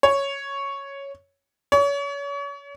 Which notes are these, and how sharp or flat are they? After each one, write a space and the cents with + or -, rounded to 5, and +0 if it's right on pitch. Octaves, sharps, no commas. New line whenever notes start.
C#5 +0
C#5 +35